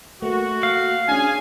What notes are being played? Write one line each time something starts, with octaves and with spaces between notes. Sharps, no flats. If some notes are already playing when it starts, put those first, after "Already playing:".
A3 A#3 F#4
F5
C#4 D4 G#4 G#5